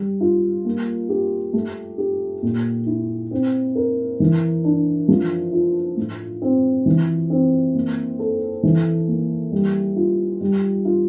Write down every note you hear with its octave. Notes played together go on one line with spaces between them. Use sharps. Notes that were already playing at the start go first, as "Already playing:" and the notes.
Already playing: G3
F4
A#3
G4
A3
G4
A#2
E4
C4
A#4
E3
D4
F3
F4
A2
C4
E3
C4
A#3
A4
E3
A#3
G3
F4
G3
F4